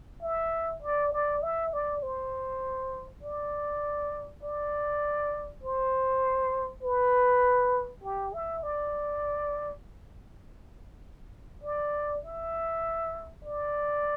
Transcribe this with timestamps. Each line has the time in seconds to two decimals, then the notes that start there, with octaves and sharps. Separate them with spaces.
0.22 E5
0.82 D5
1.13 D5
1.43 E5
1.73 D5
2.03 C5
3.23 D5
4.43 D5
5.63 C5
6.83 B4
8.04 G4
8.34 E5
8.63 D5
11.63 D5
12.24 E5
13.44 D5